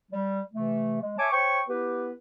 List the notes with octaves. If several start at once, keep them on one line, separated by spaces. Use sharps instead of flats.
G3
C3 E3 A3
G#3
C#5 E5 G#5 A5 D6
C5 C#5 G5 C#6
B3 E4 G4 B4